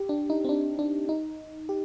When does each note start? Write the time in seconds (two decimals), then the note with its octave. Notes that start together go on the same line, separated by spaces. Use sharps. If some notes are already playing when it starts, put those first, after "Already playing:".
Already playing: G4
0.09 D4
0.30 D#4
0.44 C4
0.49 D4
0.79 D4
1.09 D#4
1.69 G4